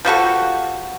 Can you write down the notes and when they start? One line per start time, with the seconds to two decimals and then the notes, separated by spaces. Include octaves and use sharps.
0.05 F3 G3 F#4 A4